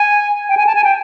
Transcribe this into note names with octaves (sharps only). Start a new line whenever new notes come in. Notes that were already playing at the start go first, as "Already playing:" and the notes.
Already playing: G#5
G5
G#5
A5
G#5
G5